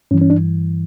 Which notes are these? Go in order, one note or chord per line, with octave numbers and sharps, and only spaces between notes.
G2 E3 C#4
C#4
D4